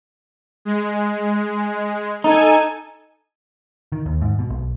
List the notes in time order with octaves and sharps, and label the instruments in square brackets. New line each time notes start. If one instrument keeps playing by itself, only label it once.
[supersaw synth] G#3
[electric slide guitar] D#4 [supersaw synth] A4 G#5 D#7
[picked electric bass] D#3
D#2
G#2
B2
B1